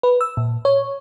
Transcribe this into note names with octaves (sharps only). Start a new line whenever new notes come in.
B4
E6
A#2
C#5